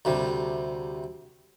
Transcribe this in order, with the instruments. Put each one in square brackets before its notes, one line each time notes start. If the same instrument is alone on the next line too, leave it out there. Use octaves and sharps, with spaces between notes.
[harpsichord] D2 C3 G3